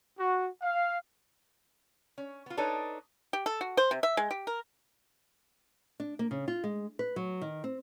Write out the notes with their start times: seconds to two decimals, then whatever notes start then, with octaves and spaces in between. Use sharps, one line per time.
0.19 F#4
0.63 F5
2.18 C#4
2.46 B3 F4
2.57 D4 D#4 A4 B4 C#5
3.33 G4
3.46 A4
3.61 F#4
3.77 C5
3.91 C3
4.03 E5
4.17 G#3
4.31 G4
4.47 A#4
6.00 D4
6.19 A#3
6.31 C#3
6.48 F4
6.64 G#3
6.99 B4
7.16 F#3
7.41 D#3
7.64 C4